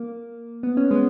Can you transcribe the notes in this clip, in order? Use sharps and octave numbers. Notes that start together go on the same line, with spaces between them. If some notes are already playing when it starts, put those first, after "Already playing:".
Already playing: A#3
B3
C#4
G#3 B3